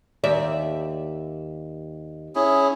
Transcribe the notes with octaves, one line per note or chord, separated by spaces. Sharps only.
D#2 D5 E5
C#4 E4 G#4